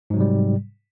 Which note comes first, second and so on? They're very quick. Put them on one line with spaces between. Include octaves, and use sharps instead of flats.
G#2 F#3 C3 G3